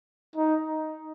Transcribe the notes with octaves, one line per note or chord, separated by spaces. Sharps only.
D#4